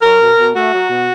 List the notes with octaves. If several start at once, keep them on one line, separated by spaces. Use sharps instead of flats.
F#3 A#4
B2
B2
A3 F#4
F#3
B2